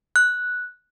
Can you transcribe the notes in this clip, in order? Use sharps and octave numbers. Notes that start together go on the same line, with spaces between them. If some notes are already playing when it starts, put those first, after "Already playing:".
F#6